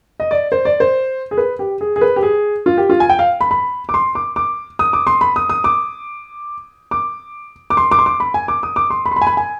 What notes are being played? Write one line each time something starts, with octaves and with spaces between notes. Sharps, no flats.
D#5
D5
C5
D5
C5
G#4
B4
G4
G#4
G#4
B4
G4
G#4
F4
G4
F4
G#5
G5
F5
B5
B5
D6
C6
D6
D6
D#6
D6
C6
B5
D#6
D#6
D6
D6
D6
C6
D6
C6
D6
B5
G#5
D6
D#6
D6
C6
B5
C6
B5
G#5
B5
G#5